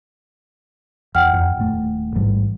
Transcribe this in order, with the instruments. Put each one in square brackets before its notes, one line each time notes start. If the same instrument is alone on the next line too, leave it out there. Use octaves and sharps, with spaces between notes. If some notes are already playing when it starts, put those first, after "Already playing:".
[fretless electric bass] E2 [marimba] F#5 G5 F6
[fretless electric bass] F2
D#1 A2 A3
A1 G#2 G3